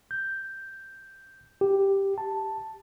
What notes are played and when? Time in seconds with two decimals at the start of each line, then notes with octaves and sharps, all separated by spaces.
0.11 G6
1.61 G4
2.18 A5